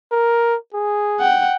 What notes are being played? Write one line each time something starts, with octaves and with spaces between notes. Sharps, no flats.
A#4
G#4
F#5 G5